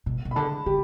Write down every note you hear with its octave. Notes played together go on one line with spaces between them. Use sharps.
B2
B2
B5
D3 A5
D3 G4